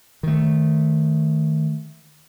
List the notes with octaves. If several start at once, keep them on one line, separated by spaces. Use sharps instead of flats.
D#3 A3